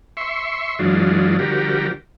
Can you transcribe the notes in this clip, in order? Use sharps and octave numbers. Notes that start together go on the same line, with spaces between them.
E5 C6 C#6
F#2 E3 F#3 G#3 D4 F4
D3 F3 G3 F#4 G4 A#4